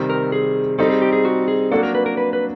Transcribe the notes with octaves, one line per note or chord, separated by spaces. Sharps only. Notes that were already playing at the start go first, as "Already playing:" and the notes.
Already playing: C3 D#3 G3 C4
A#4
G#4
G3 C4 D#4 A4
G#4
G4
G#4
F#4
G#4
F#3 A#3 D4 F#4 A4
A#4
B4
A#4
B4
B4